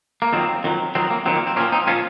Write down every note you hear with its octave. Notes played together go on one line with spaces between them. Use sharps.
A#3
F2 D#3 F#3 C4
F2 D#3 F#3
F2 D#3 F#3 C4
A#3
F2 D#3 F#3 C4
A#3
C4
A#2 F3 A#3 C#4
C4 D#4
A#2 F3 C#4 F4